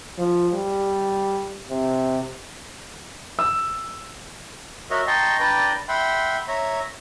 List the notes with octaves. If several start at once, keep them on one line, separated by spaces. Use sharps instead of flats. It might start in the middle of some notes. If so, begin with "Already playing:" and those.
F3
G3
C3
E6
F#4 A#4 C#5 D#5 E5
D#5 G5 A5 A#5 C6 C#6
D4 B4 D5 G5 A#5
E5 F#5 G5 B5 C6
C#5 E5 A#5